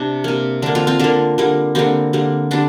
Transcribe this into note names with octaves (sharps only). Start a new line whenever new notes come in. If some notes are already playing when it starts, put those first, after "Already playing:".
Already playing: C3 D4
C3 A#3
D3 A#3 D4
C4 F4
C4 F4
D3 A#3 D4
D3 G3 A#3
D3 G3 A#3 C4
D3 G3 A#3
D3 G3 D4